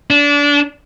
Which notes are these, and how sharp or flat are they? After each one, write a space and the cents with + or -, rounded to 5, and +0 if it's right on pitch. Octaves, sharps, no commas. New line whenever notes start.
D4 -25